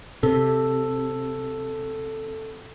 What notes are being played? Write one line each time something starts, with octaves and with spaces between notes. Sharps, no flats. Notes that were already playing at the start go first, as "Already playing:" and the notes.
C3 A4